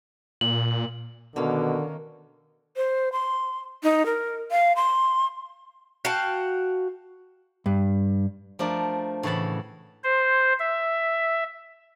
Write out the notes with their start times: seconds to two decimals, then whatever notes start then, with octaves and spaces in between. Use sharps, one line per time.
0.41 A#2 F#7
1.36 B2 D3 D#3 A#3 C#4
2.76 C5
3.13 C6
3.83 D#4
4.06 A#4
4.51 F5
4.76 C6
6.05 F#4 F5 G5 A5
7.66 G2
8.59 F3 A3 D4 A#4
9.23 A2 C#3 E3 F#5 A5 B5
10.04 C5
10.59 E5